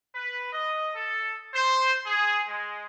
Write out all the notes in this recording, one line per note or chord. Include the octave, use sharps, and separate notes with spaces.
B4
D#5
A4
C5
G#4
G#3